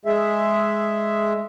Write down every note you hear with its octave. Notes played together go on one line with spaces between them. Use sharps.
G#3 G#4 E5